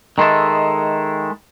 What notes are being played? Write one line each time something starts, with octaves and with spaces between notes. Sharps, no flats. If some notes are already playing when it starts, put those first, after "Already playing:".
D#3 G#3 E4 A4